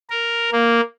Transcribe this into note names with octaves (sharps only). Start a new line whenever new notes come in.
A#4
A#3